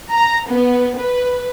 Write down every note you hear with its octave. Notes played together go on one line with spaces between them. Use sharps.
A#5
B3
B4